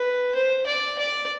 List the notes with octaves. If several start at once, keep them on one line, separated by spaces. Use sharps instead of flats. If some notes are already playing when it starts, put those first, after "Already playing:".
Already playing: B4
C5
D5
D5